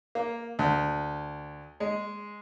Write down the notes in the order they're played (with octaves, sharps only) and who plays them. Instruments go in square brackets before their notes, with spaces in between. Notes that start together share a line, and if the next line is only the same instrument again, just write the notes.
[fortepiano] A#3
D2
G#3